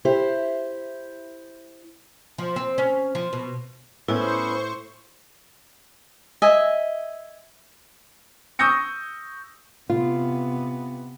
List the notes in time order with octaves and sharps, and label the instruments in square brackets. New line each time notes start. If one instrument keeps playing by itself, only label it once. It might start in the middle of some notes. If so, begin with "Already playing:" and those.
[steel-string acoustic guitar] E4 G4 C5
[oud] F3
C4
C#4
F3
B2
[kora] A2 [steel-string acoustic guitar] B3 C#4 [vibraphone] E4 [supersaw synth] C5 C#6
[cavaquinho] D#5 E5 G#5
[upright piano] C#6 D#6 E6 G6 A#6 C#7
[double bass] C3 B3 [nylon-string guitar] F4